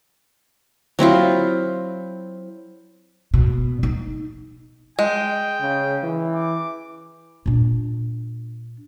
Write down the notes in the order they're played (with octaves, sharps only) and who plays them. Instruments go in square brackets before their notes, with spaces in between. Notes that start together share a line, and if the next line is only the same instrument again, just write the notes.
[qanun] F#3 C4 E4 F4
[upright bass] B2
D#4
[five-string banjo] G#3 [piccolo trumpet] G5
[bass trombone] C#3
E3
[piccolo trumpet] D6
[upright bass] A#2 D4